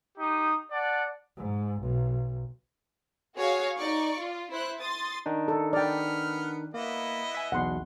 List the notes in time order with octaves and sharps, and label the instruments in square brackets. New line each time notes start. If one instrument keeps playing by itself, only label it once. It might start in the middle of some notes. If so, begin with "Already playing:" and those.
[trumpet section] D#4 G4 D#6
D5 F#5 A5
[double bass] G#2
B1
[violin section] F#4 G#4 C#5 F5
D#4 D5 C#6
F4
E4 C5 F#6
C6 D#6 A6
[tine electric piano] D#3 D4 D#4
[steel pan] A4
[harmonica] B3 F6 [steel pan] D5 G5
[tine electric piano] A#3 [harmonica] B3 E4 D#5
[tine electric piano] E5 G#5
[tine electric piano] B1 E2 B2 [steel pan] F#5 C6